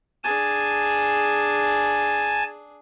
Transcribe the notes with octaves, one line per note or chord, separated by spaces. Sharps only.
D4 G#4 G#5 A5